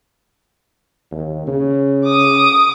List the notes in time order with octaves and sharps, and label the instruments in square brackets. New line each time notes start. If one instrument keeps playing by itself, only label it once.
[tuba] D#2
C#3
[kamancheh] D6 D#6